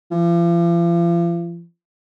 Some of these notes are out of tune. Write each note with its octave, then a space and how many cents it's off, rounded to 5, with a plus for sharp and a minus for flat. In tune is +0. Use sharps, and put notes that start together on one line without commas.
F3 -40